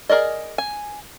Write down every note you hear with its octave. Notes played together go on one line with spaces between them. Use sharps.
G#4 A#4 D5 D#5
G#5